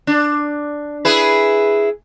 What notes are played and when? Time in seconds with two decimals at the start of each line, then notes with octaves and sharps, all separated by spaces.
0.07 D4
1.05 E4 G#4 B4